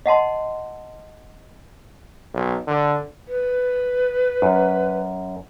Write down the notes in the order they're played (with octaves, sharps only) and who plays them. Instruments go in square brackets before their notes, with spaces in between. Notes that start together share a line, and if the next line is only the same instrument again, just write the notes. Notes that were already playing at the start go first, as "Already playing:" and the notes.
[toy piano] D#5 F#5 A5 C6
[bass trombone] B1
D3
[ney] B4
[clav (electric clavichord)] F#2